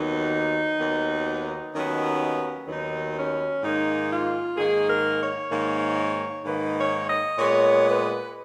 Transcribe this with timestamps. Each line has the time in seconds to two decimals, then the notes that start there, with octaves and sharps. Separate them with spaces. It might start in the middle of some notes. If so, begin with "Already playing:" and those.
Already playing: D#2 D#3 F#3 B3 D#4
0.79 D#2 D#3 F#3 B3
1.73 D#2 D#3 F#3 B3 C#4
2.67 D#2 D#3 F#3 B3 D#4
3.15 C#4
3.62 G#2 D#3 A#3 D#4
4.09 F4
4.55 G#2 D#3 A#3 G#4
4.87 A#4
5.19 C#5
5.50 G#2 D#3 A#3
6.44 G#2 D#3 A#3 B4
6.76 C#5
7.06 D#5
7.39 A#2 G#3 B3 C#5
7.85 B4